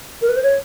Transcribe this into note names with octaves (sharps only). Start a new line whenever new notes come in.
A#4
B4
C5
C#5